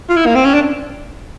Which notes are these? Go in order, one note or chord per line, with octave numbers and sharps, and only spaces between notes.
F4
E4
A#3
C4
C#4
D4